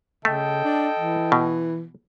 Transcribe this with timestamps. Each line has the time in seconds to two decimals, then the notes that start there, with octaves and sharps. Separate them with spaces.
0.25 C#3 A3 A4 D#5 G5
0.64 D4
0.99 E3
1.32 B2